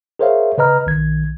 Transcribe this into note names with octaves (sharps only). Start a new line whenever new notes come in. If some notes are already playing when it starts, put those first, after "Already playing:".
G#4 A#4 C5 C#5 E5 F5
C#3 B4 D#5 A#5 F6
B1 D#3 G#6